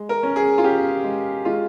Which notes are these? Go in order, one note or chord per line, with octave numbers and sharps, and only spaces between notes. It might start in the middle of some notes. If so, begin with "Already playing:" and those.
Already playing: G#3
A#4
C#4
G#4
F4
C#4 G4
G#3
G#3 F4